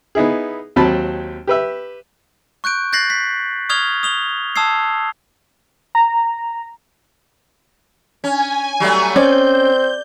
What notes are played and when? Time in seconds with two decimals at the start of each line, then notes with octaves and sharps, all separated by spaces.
0.15 B3 D#4 E4 G#4
0.76 D#2 F#3 C4 A5 B5
1.47 G4 B4 E5
2.64 C#6 F#6 G6 D7
2.93 F#6 G6 A6 A#6 C7 F#7
3.10 B6
3.69 C#6 D#6 F6 G#6 F7 G7
4.03 D#6 F7 G7
4.56 A5 D#6 E6 G#6 C7
5.95 A#5
8.24 C#4 G#5
8.80 F#3 G3 A3
9.16 C4 C#4 D5 G6